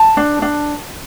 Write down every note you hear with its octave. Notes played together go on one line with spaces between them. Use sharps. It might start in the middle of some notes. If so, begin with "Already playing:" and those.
Already playing: A5
D4
D4